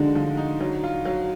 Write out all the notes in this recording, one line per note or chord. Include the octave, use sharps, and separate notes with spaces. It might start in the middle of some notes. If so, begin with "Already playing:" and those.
Already playing: D3 F3 G#3 D#4 F#4
F3
D#4
F#3
F4
F#3